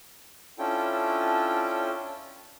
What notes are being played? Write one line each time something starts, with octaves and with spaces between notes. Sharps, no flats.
C#4 D4 E4 F4 A4 G5